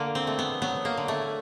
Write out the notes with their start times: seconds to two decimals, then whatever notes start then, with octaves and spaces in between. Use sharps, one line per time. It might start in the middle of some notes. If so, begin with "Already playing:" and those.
Already playing: D3 A#3
0.15 C4
0.27 A3
0.39 B3
0.62 F#3 B3
0.85 A#3
0.97 D3
1.08 A3